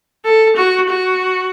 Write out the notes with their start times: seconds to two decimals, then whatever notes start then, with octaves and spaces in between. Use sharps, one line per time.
0.25 A4
0.57 F#4
0.90 F#4